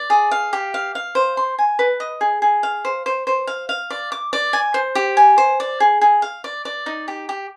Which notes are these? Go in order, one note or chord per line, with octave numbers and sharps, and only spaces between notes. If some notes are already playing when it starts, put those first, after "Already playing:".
Already playing: D5
G#4
F5
G4
F5
F5
C5
C6
G#5
B4
D#5
G#4
G#4
F5
C5
C5
C5
F5
F5
D5
D6
D5
G#5
C5
G4
G#5
C5
D5
G#4
G#4
F5
D5
D5
D#4
G4
G4